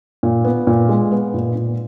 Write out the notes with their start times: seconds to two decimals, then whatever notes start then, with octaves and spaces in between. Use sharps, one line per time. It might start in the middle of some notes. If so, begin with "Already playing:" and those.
0.23 A#2
0.44 B3
0.67 A#2
0.89 G#3
1.12 B3
1.34 A#2
1.55 A#2